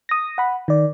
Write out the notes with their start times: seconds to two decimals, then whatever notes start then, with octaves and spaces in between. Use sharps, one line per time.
0.09 D#6 A#6
0.38 F#5 B5
0.68 D#3 D5